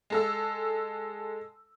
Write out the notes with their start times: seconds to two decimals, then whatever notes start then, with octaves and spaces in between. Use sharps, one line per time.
0.10 G#3 A4 E6